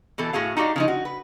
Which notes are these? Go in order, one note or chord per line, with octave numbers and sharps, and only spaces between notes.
B2 E3 A4
A2 F#4 G#4 F5
D#4 F#4 G4 D5 F5
C#3 F3 D#4
F#4
B4